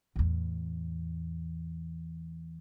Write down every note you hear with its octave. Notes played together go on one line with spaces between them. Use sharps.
E2 A2